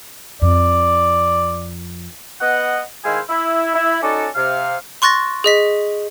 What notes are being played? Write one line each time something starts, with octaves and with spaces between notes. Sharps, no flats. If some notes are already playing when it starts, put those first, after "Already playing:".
F2 D5
B3 D#5 F#5
D#3 G#3 E4 C5 F5 G#5
E4
E4
C#4 D#4 F#4 A4 D5
C3 F5
C6 C#6 F#6 A6 A#6
G#4 D#5 B6